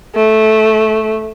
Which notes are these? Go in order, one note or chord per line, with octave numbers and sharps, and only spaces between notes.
A3